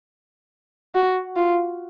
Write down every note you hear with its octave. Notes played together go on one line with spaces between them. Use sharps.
F#4
F4